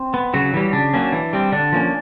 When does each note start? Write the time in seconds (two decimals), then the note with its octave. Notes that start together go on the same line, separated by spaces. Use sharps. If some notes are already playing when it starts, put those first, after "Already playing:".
Already playing: C4
0.14 B3
0.34 C#3 F#3 F#4
0.54 E3 G3
0.73 C#3 D4
0.94 F#3 A#3 C#4
1.12 E3
1.33 G3 C4
1.52 D3 D4
1.72 F3 A#3 C#4